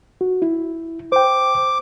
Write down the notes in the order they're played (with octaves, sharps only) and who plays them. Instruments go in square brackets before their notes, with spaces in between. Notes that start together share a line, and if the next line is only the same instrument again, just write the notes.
[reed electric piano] F#4
E4
[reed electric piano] C5 G5 [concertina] D6